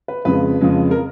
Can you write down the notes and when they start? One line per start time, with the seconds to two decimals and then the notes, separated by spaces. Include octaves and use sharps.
0.08 B4
0.25 F2 C#3 F3 G#3 B4
0.61 F2 C#3 F3 G#3
0.91 A#4